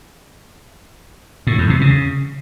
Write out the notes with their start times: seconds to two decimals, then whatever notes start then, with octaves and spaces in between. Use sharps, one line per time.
1.47 A2
1.58 E2
1.70 C3
1.81 C#3